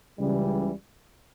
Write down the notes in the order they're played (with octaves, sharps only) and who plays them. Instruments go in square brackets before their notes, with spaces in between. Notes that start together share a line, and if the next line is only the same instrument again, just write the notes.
[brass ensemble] C#2 C#3 E3 G3